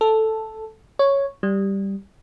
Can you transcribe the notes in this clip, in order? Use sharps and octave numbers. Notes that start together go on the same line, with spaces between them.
A4
C#5
G3